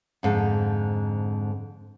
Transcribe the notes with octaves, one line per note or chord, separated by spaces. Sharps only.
F2 G#2 D3